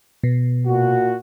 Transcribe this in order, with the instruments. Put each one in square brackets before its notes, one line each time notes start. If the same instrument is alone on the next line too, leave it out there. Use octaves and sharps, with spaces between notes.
[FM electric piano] B2
[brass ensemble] A#2 F#4